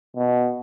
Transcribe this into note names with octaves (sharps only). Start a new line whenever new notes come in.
B2